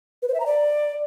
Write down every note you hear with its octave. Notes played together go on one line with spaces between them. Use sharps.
B4
C5
E5
A#5
D5